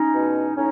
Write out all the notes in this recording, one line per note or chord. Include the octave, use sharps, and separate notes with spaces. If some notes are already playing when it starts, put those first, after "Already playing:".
Already playing: C#4 D#4
E2 B2
A2 C#4 D#4